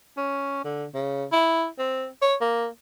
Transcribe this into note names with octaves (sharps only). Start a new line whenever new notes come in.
C#4
D3
C#3
E4
C4
C#5
A#3